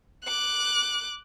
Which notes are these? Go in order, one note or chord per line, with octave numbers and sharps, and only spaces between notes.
D6 F#6